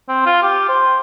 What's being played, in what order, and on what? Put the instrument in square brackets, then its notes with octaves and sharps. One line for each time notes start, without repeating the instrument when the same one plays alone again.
[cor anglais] C4
F4
G4
C5